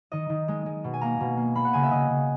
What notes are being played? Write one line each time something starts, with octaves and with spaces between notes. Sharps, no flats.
D#3 D#5
D#3
G#3
G#3
B2
G#5
A#3 A#5
B2
A#3
A#3 B5
F#5
C#3 G#5
E5
C#3 D#5
C#3